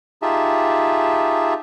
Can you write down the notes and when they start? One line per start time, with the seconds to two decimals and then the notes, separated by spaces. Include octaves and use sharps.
0.22 D#4 F4 G4 G#4 E5 A5